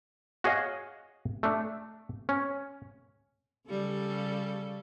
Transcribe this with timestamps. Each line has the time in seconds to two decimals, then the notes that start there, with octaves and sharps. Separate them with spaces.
0.44 F#4 G#4 C#5 D#5 F5
1.43 A3 D4
2.29 C#4
3.69 C#3 G3 A4